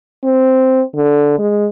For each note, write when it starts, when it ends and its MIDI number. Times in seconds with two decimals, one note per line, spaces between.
0.24 0.81 60
0.95 1.33 50
1.38 1.67 56